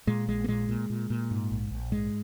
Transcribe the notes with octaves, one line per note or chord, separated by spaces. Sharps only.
A#2 G#3
A#1 G#3
A#3
A#2 G#3
A#2
A#2
A#2
G#2
A#1
A#1
G#2 G#3